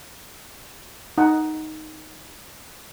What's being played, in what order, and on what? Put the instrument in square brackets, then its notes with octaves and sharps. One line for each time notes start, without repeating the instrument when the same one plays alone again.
[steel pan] D#4 F#5